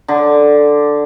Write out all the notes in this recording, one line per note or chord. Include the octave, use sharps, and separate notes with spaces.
D3